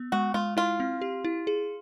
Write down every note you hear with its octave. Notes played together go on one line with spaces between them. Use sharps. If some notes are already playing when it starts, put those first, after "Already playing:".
Already playing: B3
G#3 F#4
G#3 F4
E4 F4
C4
G4
E4
G#4